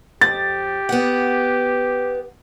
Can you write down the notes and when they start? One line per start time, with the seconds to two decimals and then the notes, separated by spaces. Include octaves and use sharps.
0.21 F2 G4 A6
0.89 B3 F#5